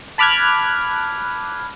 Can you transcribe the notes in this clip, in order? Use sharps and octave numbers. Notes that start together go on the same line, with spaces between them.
A5 B5 D6 F6 F#6 G#6